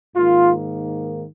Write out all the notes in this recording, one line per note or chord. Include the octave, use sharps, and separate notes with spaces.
G#2 D#3 A#3 F4